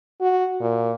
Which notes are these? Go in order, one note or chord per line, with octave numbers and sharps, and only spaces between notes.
F#4
A#2